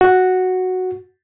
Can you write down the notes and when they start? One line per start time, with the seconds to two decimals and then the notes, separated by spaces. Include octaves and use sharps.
0.01 F#4